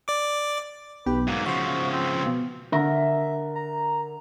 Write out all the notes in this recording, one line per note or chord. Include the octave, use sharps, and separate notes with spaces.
D5 D6
B1 G4 B4
G#2 F#3 A#3 D#6
C#3 F3 F#4 C5 E5
C4
B2
D3 A#4 E5
A#5